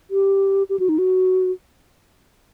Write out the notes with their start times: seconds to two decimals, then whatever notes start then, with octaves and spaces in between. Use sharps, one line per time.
0.11 G4
0.69 G4
0.79 F#4
0.89 D#4
0.98 F#4